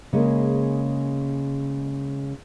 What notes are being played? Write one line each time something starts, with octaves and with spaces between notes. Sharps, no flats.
C#3 G#3 A#3